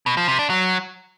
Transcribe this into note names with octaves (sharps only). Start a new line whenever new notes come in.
B2
F3
C3
D4
F#3